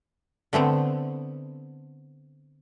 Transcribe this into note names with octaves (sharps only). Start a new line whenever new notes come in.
D3 A3 B3 C4